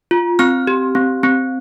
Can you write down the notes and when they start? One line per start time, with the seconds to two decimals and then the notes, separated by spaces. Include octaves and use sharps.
0.11 F4
0.39 C4 F6
0.67 G4
0.95 C4
1.23 C4